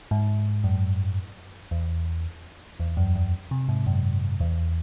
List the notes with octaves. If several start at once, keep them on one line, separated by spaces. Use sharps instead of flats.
G#2
F#2
E2
E2
F#2
F#2
C3
G#2
F#2
E2